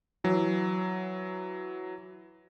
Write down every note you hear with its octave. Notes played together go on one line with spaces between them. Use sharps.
E3 F#3